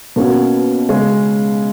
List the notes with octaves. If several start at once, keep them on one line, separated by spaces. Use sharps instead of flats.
B2 A#3 C#4 F#4
C#3 G#3 C#4